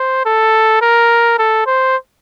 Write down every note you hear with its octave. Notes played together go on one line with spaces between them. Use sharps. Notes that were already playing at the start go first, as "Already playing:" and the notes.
Already playing: C5
A4
A#4
A4
C5